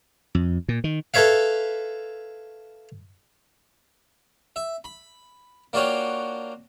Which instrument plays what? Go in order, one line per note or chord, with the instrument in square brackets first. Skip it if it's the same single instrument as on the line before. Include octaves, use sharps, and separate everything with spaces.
[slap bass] F2
A#2
D#3
[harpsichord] A4 B4 C#5 E5 F5
E5
B5
A#3 D4 F4 F#4 C#5 G5